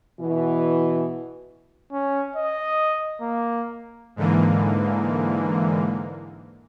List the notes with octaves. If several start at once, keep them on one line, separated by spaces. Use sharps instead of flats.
B2 E3
C#4
D#5
A#3
G#2 D3 E3 A#3